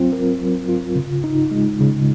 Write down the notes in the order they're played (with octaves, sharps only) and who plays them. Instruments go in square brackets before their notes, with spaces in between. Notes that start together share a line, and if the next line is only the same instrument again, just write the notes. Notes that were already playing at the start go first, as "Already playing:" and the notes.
Already playing: [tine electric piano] F#3 C4 F4
A#4
F#3
F4
C#3
D#4
G#3
C#3